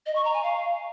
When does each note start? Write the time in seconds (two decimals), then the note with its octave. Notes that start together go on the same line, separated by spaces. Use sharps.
0.06 D#5
0.15 C#6
0.25 A#5
0.34 G#5
0.43 F5